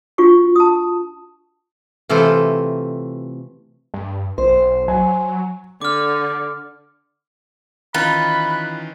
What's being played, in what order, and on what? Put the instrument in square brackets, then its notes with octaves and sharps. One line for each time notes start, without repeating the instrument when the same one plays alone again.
[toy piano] D4 F4 F#4 C#6
A5 D#6
[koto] C3 E3 A3 F4 A4
[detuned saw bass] G2
[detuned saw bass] B1 [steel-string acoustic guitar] C5
[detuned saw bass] F#3 [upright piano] G#5
[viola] D3 [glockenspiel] D6 F6
[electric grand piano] D#3 E3 C#4 [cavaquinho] D#4 F4 [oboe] B5 [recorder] F#6